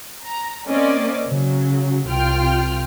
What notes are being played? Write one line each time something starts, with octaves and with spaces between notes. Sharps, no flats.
A#5
A#3 C4 C#4 D5 D#5
C#3 F#3
C2 F4 G5 F6